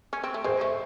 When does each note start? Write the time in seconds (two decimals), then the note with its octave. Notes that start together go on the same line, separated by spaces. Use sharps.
0.13 C#4
0.24 C4
0.34 A3
0.44 G#3 C5
0.61 A3